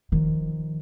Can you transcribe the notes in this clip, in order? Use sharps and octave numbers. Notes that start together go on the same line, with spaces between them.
D#3 F3